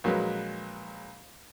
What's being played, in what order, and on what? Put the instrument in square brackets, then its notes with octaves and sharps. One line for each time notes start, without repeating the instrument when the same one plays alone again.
[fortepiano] A#1 F#3 G#3 B4